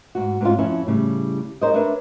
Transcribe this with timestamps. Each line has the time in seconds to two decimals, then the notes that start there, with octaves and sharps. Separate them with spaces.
0.15 G#2 F#4
0.41 G#2 C4 C#4 F4
0.58 F2 C#4 E4
0.87 A2 C#3 G3
1.61 D#4 G#4 A#4 C5 C#5 D#5
1.74 D4 A#4 B4 C#5 E5